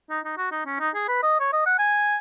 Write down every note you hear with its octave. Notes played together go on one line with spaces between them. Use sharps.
D#4
D#4
F#4
D#4
C#4
D#4
G#4
B4
D#5
C#5
D#5
F#5
G#5